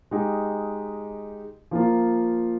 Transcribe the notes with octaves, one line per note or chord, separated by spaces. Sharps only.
G#3 D#4 G4
F3 A#3 F4